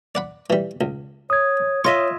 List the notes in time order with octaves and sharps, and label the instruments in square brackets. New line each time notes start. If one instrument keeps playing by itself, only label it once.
[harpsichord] D5 F#5 B5
E3 G3
C#2
[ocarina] C#5 [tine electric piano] D#6 G#6
[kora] F4 D#5 E5 [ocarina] C#5 [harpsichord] C#6